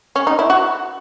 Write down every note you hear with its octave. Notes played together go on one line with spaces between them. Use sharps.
C#4
D#4
E4
F#4